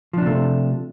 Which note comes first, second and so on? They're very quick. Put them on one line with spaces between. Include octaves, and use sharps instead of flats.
F3 D4 C3 A3